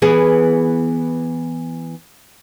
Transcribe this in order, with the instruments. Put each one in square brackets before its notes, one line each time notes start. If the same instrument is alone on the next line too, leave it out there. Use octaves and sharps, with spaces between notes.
[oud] E3 B3 G#4